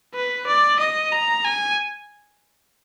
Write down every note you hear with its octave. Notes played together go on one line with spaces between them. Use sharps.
B4
D5
D#5
A#5
G#5